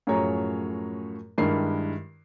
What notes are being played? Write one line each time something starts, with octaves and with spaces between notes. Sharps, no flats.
F#2 A2 F3 G#4 C#5 A#5
G2 D#3 G#3 E4 A#4 C7